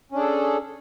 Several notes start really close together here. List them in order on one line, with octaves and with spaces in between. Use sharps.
C#4 D4 G#4 A4